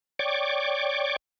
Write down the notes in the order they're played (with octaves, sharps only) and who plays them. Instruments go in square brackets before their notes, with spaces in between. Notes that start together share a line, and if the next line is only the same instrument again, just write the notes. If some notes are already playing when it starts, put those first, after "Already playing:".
[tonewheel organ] C#5 D5 G5 C#6 D6